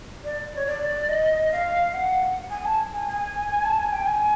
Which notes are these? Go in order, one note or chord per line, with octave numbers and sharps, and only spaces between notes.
D5
C#5
D5
D#5
F5
F#5
G#5
A5
G#5
G#5
A5
G#5
G5
G#5